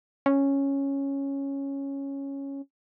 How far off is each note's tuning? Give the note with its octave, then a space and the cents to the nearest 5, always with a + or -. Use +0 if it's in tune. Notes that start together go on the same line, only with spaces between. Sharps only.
C#4 -5